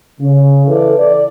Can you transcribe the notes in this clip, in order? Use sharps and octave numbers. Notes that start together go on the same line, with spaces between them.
C#3
E3 A4 D5
D5